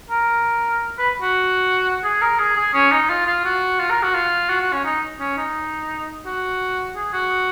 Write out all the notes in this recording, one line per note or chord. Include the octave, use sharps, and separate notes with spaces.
A#4
B4
F#4
G#4
A#4
G#4
G#4
C#4
D#4
F4
F4
F#4
F4
A#4
F#4
F4
F#4
F#4
C#4
D#4
C#4
D#4
F#4
G#4
F#4